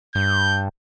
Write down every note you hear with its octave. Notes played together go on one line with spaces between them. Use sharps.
G2 G6